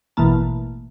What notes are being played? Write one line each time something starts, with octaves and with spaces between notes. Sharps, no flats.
A1 B2 E3 A#3 A5